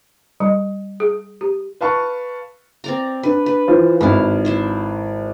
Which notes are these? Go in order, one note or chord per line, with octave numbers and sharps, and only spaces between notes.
G3
G#4
G4
B4 F5 A5 C#6
C4 D5 A#5
D4 B4
B4
E3 F4 C5
G#1 E4 F5
E4 C5 E5